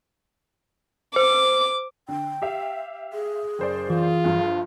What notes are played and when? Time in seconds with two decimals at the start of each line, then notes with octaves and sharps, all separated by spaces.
1.16 C5 D6
2.08 D3 G5
2.42 G4 E5 F5
3.13 G#4
3.59 F#1 C5 D5
3.90 E3 F4
4.24 G1 G2 F3